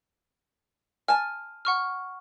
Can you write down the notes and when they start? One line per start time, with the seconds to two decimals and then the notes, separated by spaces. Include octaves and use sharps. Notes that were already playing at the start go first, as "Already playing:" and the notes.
1.08 G#5 A5 F6
1.65 F#5 C#6 F6